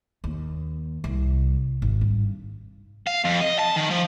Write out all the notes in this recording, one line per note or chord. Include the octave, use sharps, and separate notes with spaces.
D#2
C2
G#1
G2
F5
F2
D#5
A5
D#3
F3